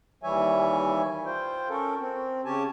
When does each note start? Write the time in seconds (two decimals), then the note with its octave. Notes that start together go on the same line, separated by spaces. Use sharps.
0.23 D#2 E3 G3 C#5 E5 G#5
1.26 F4 C5 G5
1.69 C#4 A4 A#4
2.00 C4
2.45 C#3 C#4 G4 G#5 A5